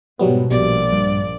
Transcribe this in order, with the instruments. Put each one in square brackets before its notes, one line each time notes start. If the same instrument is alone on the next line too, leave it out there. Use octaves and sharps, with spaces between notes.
[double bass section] G#2 B2 [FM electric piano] F#3 G3 B3
[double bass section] A#1 [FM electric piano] B2 G3 [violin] D5
[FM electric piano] G2